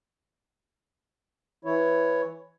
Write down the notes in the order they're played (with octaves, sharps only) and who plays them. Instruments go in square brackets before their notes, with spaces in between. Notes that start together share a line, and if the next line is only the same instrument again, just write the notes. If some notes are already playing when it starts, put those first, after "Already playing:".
[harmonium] E3 E4 C#5